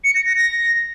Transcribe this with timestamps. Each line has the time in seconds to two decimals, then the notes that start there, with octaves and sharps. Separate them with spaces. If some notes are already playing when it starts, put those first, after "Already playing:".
0.04 C#7
0.15 A#6
0.25 A#6
0.35 A#6